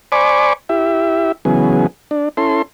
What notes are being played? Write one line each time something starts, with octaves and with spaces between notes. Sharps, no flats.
C5 D5 G#5 B5 C#6 D6
E4 G4 E5
C#3 E3 F#3 B3 G#4
D4
C#4 E4 A4 C6